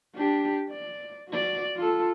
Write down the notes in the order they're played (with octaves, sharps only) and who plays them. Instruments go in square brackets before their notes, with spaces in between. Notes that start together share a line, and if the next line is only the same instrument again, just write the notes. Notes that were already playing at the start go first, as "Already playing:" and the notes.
[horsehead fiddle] D4 G4
D5
F#4 D5
F4 A4